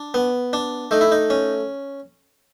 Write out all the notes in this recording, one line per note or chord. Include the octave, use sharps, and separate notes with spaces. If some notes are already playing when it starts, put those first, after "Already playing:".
Already playing: D4
B3
D4
A3 D#4
E4
D#4
C#4